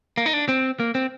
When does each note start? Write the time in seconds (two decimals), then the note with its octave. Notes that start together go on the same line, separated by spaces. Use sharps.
0.18 A#3
0.26 D#4
0.33 D4
0.49 C4
0.80 A#3
0.95 C4